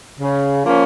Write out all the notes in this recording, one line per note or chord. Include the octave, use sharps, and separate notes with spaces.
C#3
F3 A#3 C#4